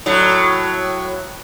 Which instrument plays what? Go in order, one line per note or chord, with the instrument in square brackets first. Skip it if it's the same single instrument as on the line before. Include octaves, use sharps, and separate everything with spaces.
[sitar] A2 F#3